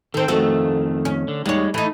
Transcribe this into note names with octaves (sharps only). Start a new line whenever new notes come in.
D#3 C4 A4 C5
F2 D#3 A3 F#4 A4
C#4
D3
D#2 G3 G#3 C#5
E3 A3 D#4